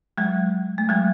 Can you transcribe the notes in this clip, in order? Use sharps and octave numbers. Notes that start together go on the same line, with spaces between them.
F#3 G#3
A3
F#3 G#3